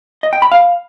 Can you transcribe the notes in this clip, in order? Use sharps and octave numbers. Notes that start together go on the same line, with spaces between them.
D#5
G5
B5
F5